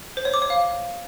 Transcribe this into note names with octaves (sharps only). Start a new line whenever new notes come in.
C5
C#5
D6
C#5
F5